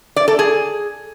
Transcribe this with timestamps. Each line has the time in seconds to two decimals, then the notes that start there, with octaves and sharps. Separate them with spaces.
0.16 D5
0.28 A4
0.39 G#4